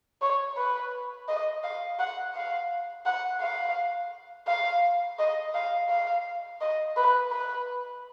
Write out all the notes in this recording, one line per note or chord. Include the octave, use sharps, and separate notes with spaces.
C#5
B4
D#5
F5
F#5
F5
F#5
F5
F5
D#5
F5
F5
D#5
B4
B4